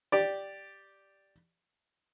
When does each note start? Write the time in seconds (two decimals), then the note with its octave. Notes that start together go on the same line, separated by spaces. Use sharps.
0.12 G4 D5